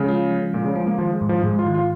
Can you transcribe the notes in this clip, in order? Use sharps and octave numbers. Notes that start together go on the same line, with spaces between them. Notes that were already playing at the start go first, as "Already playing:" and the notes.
Already playing: C#3 F3 G#3
F4
F3
A#2 G#3
C#3
F3 G#3
A#3
D#3 F3
G#3
G#2
F3
G#2 G#3
F4
D#3
F4